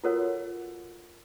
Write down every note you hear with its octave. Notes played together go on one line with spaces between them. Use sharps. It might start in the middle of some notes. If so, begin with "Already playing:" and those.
F4 F#4 A4 A#4 C#5 F#5